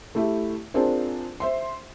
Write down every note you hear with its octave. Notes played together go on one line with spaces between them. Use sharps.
A3 E4 G4 E5
C4 D4 F4 G#4 A#4 C5
C5 E5 C6